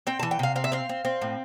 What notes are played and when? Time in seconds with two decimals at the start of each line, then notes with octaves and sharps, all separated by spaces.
0.07 C4 G5
0.20 E3 A5
0.31 G5
0.39 C3 F5
0.56 C4 F5
0.64 E5
0.72 C4 F5
0.89 C4
1.05 C4
1.22 A2